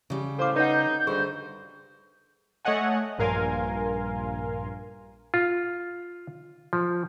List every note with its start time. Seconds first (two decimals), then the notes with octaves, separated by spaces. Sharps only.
0.10 C#3 G3
0.38 A2 A4 C5 F5 D6
0.56 D#4 B4 C#5 F#5 G6
1.07 D2 G2 D3 G#4 C5
2.65 A3 C#5 D#5 F#5 G#5
3.18 A#1 G2 A#4 F5 G#5 C6
5.34 F4
6.73 F3